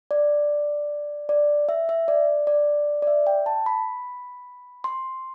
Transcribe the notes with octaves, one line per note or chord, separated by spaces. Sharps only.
D5
D5
E5
E5
D5
D5
D5
E5
G5
A5
B5
C6